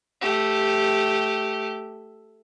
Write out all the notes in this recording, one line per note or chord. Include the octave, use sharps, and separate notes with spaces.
A3 G4